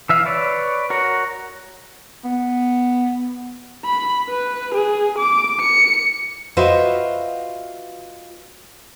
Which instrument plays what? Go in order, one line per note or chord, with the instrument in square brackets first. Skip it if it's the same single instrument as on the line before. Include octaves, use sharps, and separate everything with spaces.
[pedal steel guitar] E3 E5 F5
B4 C#5 D5
F#4 A#4 C#5
[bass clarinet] B3
[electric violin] B5
B4
G#4
D6
C#7
[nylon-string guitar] F4 F#4 B4 C5 D#5 E5